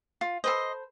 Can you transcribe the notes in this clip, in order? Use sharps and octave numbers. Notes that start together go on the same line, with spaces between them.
F4
A4 B4 C5 D#5 C6